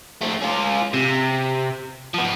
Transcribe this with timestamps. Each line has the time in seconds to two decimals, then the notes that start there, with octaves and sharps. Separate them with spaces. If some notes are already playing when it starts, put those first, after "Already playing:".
0.22 A3 C4
0.42 C#4 F4
0.94 C3
2.14 F3 B3